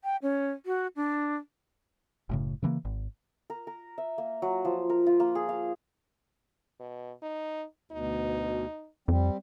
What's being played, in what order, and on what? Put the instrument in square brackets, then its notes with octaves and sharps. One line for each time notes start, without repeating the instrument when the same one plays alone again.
[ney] G5
C#4
F#4
D4
[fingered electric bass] F#1 A2 C#3
C#3 E3 G3 A#3
G#1
[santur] A#4
A#4
E5
A#3
F#3
F3
A#4
F4
A#3
G#4
F5
[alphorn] B2
D#4
[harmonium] D2 B2 [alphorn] D#4
[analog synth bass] F2 [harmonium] G3 C4